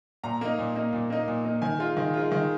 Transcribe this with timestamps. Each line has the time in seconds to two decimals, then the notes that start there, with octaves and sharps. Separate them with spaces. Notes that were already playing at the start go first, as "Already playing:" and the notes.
0.23 A#2 A#5
0.41 A#3 D#4
0.59 A#2
0.75 A#3 D#4
0.93 A#2
1.10 A#3 D#4
1.28 A#2
1.45 A#3 D#4
1.62 D#3 G#5
1.79 G#3 F4
1.97 D#3
2.14 G#3 F4
2.32 D#3